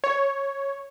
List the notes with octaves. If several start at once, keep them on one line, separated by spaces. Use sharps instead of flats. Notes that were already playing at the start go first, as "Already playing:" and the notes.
C#5